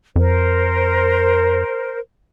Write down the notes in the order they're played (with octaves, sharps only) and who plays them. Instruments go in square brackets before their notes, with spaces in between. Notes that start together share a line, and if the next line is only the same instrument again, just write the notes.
[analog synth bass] F2 [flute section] A#4 C5